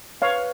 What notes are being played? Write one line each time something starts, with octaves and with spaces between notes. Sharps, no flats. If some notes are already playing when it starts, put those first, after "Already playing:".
B4 C#5 F5